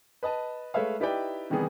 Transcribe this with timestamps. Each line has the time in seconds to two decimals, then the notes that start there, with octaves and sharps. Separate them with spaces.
0.23 B4 D#5 A5
0.74 G#3 A3 B4 C#5 E5 F5
1.00 D#4 E4 G4 B4 D5 G5
1.50 C3 D#3 E3 G3 B3 G#4